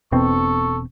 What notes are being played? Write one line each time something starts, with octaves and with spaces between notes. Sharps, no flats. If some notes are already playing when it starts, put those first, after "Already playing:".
E1 B2 C4 A4 C#6